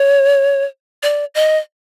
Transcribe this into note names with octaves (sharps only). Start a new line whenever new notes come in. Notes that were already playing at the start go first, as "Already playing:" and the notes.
Already playing: C#5
D5
D#5